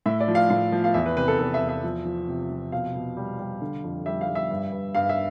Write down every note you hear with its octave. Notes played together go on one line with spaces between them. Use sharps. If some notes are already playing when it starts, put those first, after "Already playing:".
A2 E5
D5
F3
F5
A2 F5
F3
F5
E2 E5
B4
C3 B4
A4
E2 A4
E5
E2
E5
F3
F3
C3
F3
B2 F5
B2
G3
G3
D3
F2
G3 E5
F5
G3
E5
G2
G2
G2 F5
E5